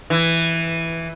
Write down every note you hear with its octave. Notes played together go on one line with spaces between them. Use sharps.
E3